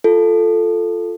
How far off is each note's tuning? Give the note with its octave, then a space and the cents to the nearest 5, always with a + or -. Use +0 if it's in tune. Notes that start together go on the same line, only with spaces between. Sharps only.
F4 +0 A4 +0